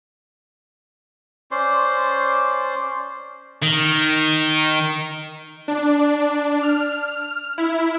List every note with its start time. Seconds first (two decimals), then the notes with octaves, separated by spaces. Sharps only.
1.51 C#4 C5 D5 C6
3.62 D#3
5.68 D4
6.63 F6
7.58 E4